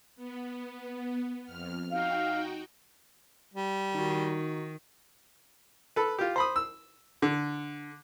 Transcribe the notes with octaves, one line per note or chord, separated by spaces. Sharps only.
B3
F2 F6
D#4 F#4 F5 G5
G3
D#3 D#4 F#4
A4 B4
F4 G4
C5 B5 D#6
E6
D3